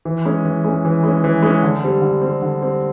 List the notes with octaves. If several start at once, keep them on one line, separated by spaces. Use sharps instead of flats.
E3
G#3 C#4
E3
G#3 C#4
E3
G#3 C#4
E3
G#3 C#4
D3
G3 C4
D3
G3 C4
D3
G3 C4